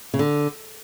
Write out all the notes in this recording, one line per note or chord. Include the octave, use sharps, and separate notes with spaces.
C#3
D3